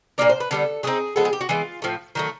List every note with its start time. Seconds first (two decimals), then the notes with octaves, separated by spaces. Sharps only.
0.18 A#2 F#3 A#3 D4 D5
0.29 C5
0.40 B4
0.51 D3 G3 B3 A4
0.83 F#3 A3 C4 D#4 G#4
1.16 F3 G#3 B3 A4
1.25 G#4
1.33 G4
1.41 F#4
1.49 E3 G#3 B3 F4
1.82 A2 F3 A3
2.15 D#3 F#3 A3